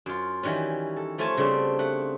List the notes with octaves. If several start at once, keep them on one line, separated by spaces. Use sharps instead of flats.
F#2 F4
D#3 E3 G3 C#4
A4
F3 A3 F4 C#5 G#5 A5
C#3 G3 C4 D4
A3 F#5